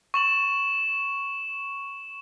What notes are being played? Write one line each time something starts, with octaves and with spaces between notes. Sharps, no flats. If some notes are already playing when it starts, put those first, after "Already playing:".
C#6 E7 F#7